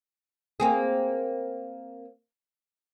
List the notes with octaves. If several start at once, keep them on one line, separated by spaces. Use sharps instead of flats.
A#3 C4 G#4